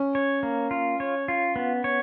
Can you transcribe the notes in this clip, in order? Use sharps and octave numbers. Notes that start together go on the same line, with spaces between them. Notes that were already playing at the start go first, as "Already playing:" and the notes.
Already playing: C#4
C#5
A#3
F4
C#5
F4
B3
C#5